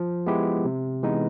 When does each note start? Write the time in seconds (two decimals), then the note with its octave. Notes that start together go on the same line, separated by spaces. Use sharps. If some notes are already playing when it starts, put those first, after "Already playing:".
Already playing: F3
0.26 G#3 B3 E4 G4
0.65 C3
1.03 E3 G#3 B3 D#4